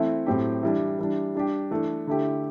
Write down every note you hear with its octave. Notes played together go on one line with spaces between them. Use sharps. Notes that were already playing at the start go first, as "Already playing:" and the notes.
Already playing: E3 A3 C4 E4
A2 F#3 C4 G4
E3 G3 D4
E3 G3 D4
G3 D4 G4
E3 A3 D4
D3 A3 E4 G4